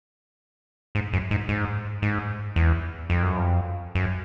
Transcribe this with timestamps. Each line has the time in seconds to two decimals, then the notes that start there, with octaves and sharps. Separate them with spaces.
0.95 G#2
1.13 F#2
1.31 G#2
1.49 G#2
2.02 G#2
2.56 E2
3.10 F2
3.23 F#2
3.37 F2
3.95 F#2